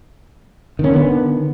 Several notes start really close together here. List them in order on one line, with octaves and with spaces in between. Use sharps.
D#3 C#4 D3 B3